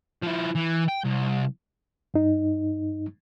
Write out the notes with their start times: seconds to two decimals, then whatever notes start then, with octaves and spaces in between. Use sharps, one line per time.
0.22 F3 E4
0.55 E3
0.88 G5
1.04 C2
2.14 G2 D#4